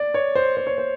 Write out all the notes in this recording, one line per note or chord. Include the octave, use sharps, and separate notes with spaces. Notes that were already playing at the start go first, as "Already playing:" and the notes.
Already playing: D5
C#5
C5
C5
C#5
C5